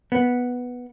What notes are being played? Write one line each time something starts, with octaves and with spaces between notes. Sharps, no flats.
B3